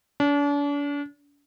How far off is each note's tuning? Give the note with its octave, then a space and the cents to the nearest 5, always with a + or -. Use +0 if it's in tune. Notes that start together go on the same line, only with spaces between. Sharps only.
D4 -40